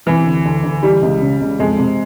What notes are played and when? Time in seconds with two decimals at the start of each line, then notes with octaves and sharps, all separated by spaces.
0.06 C3 E3
0.26 D2
0.45 D2
0.64 D2
0.83 E3 G3
1.02 C#2
1.22 C#3
1.41 C#2
1.59 F2 G#3
1.78 C3